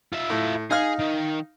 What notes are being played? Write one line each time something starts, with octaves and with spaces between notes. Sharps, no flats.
F4 E5
A2
D#4 G#4 F5 F6
D#3